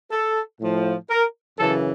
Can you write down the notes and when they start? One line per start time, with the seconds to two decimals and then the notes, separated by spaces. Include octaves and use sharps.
0.10 A4
0.60 A2 F3
1.09 A#4
1.57 F#2 C#3 E3 A4